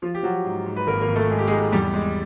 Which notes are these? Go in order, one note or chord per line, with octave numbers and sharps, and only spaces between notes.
F3 F4
G4
F3 F#3 F#4
G#2
G#2
B4
G#1 A#3 A#4
A#3 A#4
G#1
A3 A4
G#3 G#4
G4
G#3 G#4
G#2
E2 G3 G4
G#3